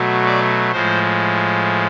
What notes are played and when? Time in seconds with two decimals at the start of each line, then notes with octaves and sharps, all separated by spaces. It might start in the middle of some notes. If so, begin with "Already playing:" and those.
Already playing: B2 F#3 A3
0.26 D5
0.71 A2 F3 G#3 C5